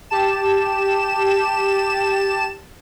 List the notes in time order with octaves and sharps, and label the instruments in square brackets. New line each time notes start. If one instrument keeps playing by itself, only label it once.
[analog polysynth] G4 A5 E7